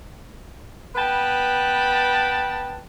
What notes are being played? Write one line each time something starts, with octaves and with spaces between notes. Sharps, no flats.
B3 B4 G5 A5 B5